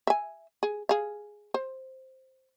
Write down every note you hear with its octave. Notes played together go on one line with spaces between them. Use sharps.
E5 G#5
G#4
G#4 F5
C5